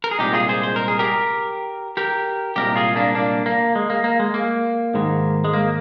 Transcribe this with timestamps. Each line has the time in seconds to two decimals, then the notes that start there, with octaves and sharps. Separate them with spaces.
0.04 A#4
0.11 G#4
0.19 C2 A#2 G#3 D#4 G4
0.33 F4 G#4
0.49 G#4 C5
0.63 C5
0.76 A#4
0.88 G#4
0.99 G4 A#4
1.97 G4 A#4
2.56 C2 A#2 G#3 G4 A#4
2.76 F4 G#4
2.96 A#3 D4
3.15 A#3 D4
3.46 A#3
3.75 G#3
3.90 A#3
4.04 A#3
4.19 G#3
4.34 A#3
4.94 G#2 D#3 G#3
5.44 G#3
5.53 A#3